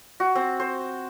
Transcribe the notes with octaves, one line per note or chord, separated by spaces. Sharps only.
F#4
C4
C5